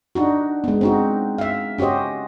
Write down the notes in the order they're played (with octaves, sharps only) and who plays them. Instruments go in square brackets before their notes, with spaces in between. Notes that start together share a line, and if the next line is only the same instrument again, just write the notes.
[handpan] D4 D#4 F#4
G#3 B3
C4 D#4 F#4
E5 F5
C#4 F#4 G4 C5 D#5